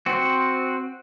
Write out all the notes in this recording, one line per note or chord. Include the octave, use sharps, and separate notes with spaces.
C4 F#4